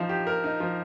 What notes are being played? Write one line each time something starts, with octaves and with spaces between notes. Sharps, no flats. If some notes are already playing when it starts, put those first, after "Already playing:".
Already playing: F3 D#4
G4
A#4
D#4
F3